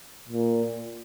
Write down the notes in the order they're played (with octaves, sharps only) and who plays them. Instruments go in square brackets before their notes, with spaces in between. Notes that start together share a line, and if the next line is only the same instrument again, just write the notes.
[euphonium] A#2